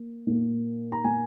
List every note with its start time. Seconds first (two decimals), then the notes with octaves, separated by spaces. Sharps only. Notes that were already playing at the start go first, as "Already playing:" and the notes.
Already playing: A#3
0.27 A#2 A#3
0.92 A#5
1.04 A#2 A#3 G#5